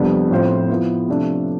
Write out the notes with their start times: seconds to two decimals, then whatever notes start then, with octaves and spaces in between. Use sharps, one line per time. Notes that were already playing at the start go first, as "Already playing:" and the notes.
Already playing: F2 C3 G3 B3 D4
0.30 A2 F3 C4 F4 C5
0.69 F3 B3 E4 B4
1.08 C3 F3 A3 D4